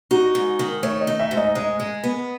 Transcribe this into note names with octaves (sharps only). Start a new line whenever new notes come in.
D#4 F#4
G#2
D#3
A3 C#5
D#5
D#4
E5
G#2
D#5
G#3 D#5
G#3
B3